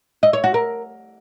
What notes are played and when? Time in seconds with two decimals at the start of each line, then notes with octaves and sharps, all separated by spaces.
0.23 D#5
0.33 C#5
0.44 F#4
0.54 A#4